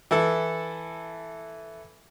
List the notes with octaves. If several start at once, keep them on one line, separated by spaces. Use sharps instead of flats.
E3 E4 A4